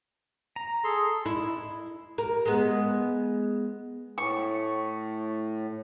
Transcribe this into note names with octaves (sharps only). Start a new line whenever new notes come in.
A#5
G#4 A4 C6
E4
A#4
G#3 B3
A2 C#6